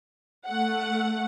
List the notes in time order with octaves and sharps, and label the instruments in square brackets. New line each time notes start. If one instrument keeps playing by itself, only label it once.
[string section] A3 F#5